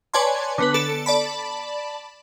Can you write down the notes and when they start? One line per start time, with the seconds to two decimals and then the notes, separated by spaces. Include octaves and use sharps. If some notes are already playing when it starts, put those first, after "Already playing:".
0.14 B4 C#5 D5 G#5 A5 C6
0.58 D3 B3 B4
0.74 A4 A5 C#7 D7
1.06 D5 A5 B5